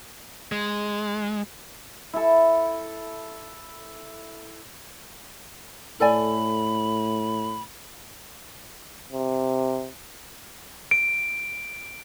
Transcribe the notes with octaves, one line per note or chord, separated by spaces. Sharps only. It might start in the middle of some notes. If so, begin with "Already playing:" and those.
G#3
E4 A4
A2 A4 D5 G#5 B5
C3
D7